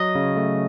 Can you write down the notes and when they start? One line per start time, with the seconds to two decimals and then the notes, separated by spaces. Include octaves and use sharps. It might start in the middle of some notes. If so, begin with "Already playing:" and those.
Already playing: F#3 D#5
0.15 C#3
0.36 A3